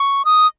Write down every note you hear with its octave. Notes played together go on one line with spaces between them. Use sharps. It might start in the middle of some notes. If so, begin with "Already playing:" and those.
Already playing: C#6
D#6